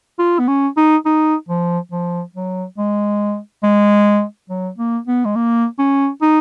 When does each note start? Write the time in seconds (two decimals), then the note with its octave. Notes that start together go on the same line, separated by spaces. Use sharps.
0.19 F4
0.39 B3
0.48 C#4
0.77 D#4
1.05 D#4
1.49 F3
1.92 F3
2.34 F#3
2.78 G#3
3.63 G#3
4.50 F#3
4.78 A#3
5.07 B3
5.25 G#3
5.36 A#3
5.79 C#4
6.22 D#4